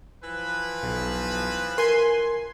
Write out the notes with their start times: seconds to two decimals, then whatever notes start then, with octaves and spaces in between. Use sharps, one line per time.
0.24 E3 F3 B4
0.83 B1
1.78 A#4 G#5 C6